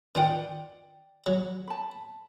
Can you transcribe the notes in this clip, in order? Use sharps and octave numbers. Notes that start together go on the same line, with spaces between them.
D#3 F4 D5 F#5 G5
F#3
A5 B5